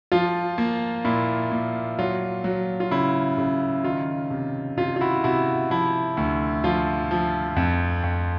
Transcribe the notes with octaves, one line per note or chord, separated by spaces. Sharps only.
F3 F4
A#3
A#2 E4
A#2
F#3 F4
F#3
F4
C#3 E4
C#3
D#3 F4
C3
C3 F4
F4
E4 F#4
C3 E4 F#4
F3 E4
D2
F3 F4
F3
F2
F2